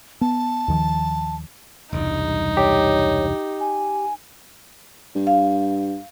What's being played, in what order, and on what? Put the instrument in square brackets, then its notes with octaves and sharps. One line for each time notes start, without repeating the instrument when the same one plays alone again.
[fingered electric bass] B3 [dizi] A5
[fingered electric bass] D#2 D#3 F3
[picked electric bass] E1 C2 G2 [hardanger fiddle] D#4
[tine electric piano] G4 [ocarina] C#5
[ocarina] G#5
[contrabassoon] G2
[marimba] F5